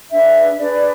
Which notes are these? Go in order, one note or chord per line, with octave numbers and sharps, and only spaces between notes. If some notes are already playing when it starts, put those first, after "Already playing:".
D4 G#4 B4 E5
D4 G#4 B4 D5